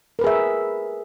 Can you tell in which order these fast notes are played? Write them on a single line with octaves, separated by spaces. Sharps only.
A#4 B4 G#4 E5